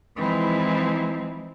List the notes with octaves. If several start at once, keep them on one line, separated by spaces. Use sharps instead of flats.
E3 F3 G#3 C4 D#4 E4